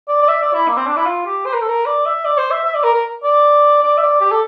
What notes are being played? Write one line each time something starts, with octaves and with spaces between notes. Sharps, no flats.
D5
D5
E5
D5
E4
A#3
C4
D4
E4
F4
G4
C5
A#4
A4
A#4
D5
E5
D5
C5
E5
E5
D5
A#4
A#4
D5
D5
E5
D5
G4
A4